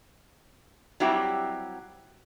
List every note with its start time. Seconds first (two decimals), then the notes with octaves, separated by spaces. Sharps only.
1.00 F#3 G3 C4 E4 F#4 G4